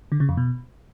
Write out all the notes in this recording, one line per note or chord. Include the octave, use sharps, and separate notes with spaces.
D3
C#3
F2
B2